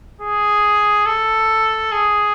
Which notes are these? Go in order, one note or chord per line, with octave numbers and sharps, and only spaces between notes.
G#4
A4
G#4